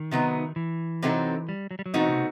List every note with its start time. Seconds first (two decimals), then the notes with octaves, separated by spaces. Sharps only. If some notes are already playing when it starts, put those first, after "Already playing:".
Already playing: D#3
0.11 C3 F#3 B3 D#4
0.56 E3
1.02 C3 F#3 C4 D#4 A4
1.49 G3
1.71 F#3
1.79 G3
1.86 F#3
1.94 B2 E3 A3 C4 D#4 F#4
2.09 C3